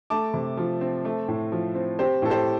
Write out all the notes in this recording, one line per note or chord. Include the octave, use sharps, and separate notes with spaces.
A3 A5 D6
C3
F3
C4
A3
A2
F3
C4
C4 G4 C5
A2 A4
G4 C5